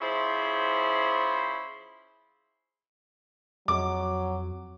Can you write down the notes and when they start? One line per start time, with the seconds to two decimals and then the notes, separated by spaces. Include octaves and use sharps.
0.01 F3 C#4 E4 G#4 C5
3.68 F2 F#3 D6